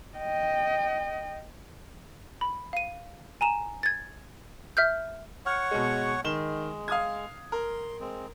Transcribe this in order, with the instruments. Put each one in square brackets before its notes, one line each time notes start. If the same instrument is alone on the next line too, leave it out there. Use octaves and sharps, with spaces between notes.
[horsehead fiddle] D#5 G5
[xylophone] B5
F5 D#7
G#5 A#5 E7
G#6 A6
E5 F6 G6
[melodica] C#5 F#5 C#6 [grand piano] F6
[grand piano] B2 G#3
[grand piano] D#3 E7 G7 [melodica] G#3
[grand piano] F5 D#6 G#6
[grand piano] A#4 [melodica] C6
[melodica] G#3 C4